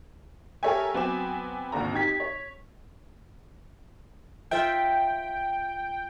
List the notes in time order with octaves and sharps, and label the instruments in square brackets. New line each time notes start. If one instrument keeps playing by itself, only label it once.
[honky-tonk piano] G4 A4 A#4 C#5 E5 G#5
F#3 B3 C4 G#5 D6 E7
G#1 D#2 D3 A#5
D#4 G4 G#6 B6
C#5
[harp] F4 C5 E5 [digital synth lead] G5